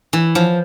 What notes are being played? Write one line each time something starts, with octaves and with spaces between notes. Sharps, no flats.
E3
F3